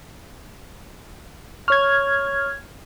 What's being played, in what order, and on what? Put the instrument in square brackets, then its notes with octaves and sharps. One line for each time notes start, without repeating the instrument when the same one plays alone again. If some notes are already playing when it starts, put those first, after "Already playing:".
[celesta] C#5 C#6 [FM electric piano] F6 G#6